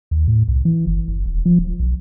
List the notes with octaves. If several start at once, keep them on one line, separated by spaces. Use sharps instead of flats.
D#2
A2
C2
E3
F#1
F#1
D#1
F3
D1
B1